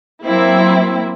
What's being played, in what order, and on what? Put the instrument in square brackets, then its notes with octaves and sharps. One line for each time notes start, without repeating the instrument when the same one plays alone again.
[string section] F#3 A#3 C4 E4